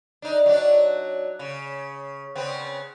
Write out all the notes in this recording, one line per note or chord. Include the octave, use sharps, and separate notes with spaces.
D4 D#4
F#3 D4
C#3
C#3 B3 C4